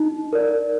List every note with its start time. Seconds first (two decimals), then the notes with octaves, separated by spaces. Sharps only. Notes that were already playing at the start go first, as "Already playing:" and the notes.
Already playing: D#4
0.33 A#4 D5